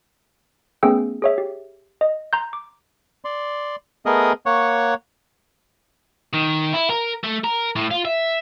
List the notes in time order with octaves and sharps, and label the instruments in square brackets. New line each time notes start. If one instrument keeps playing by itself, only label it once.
[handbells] A3 B3 C#4 G#4 G5 E6
G#4 C#5 E5
G4
D#5
A#5 C6 G6
D6
[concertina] D5 C6
A3 B3 G#4 A#4 D#5 D#6
A#3 C#5 F#5 C#6
[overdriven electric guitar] D#3
E4
A#4
A3
A#4
A2
F4
E5